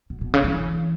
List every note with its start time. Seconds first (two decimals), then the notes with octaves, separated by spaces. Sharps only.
0.10 B2
0.21 B2
0.34 C#3
0.44 E3